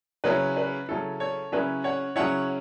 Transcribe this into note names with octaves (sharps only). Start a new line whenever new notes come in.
C#3 F#3 C#4 E4 B4
B4
C#3 F#3 C#4 E4 A4
A4 C#5
C#3 F#3 C#4 E4 B4 E5
C#5 F#5
C#3 F#3 C#4 E4 C#5 F#5